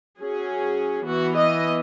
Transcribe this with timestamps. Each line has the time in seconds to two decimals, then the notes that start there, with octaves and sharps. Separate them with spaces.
0.18 F#3 C#4 G#4
1.05 E3 B3 F#4
1.35 D#5